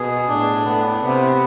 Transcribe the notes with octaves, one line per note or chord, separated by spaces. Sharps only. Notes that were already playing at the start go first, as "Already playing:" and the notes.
Already playing: B2 G#4
A2 D4
A2 B3
C3 B3